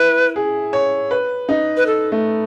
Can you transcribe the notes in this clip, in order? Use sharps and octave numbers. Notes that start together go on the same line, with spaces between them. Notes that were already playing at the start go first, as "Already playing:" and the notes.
Already playing: E4 B4
G#4
C#5
B4
D#4
B4
A4
A3